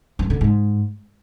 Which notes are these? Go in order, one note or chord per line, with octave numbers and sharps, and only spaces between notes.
G2
D3
G#2